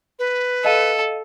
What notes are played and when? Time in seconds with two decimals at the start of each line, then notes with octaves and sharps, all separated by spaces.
0.19 B4
0.65 A4 D#5 F5 D#7